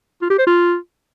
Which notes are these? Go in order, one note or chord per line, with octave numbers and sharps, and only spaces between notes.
F4
G4
C5
F4